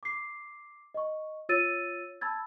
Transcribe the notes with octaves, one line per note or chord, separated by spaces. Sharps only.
D6 C7
D#5 C#6
F4 C#5 E6 A6 D#7
A5 B5 E6 G#6 A6